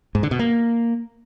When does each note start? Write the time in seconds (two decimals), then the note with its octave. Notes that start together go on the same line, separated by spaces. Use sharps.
0.15 G#2
0.23 D3
0.31 B2
0.39 A#3